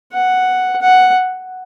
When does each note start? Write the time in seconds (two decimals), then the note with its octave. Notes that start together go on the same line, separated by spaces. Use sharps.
0.13 F#5
0.81 F#5